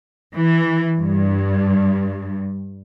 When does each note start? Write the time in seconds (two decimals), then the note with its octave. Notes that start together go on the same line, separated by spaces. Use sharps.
0.35 E3
0.97 G2